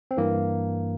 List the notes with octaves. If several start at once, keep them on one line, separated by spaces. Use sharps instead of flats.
C4
G2 E3 A#3